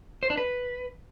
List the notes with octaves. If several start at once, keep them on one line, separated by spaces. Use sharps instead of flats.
C5
D4
B4